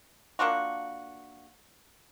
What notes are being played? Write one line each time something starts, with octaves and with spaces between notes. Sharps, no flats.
A#3 D4 F4 F#4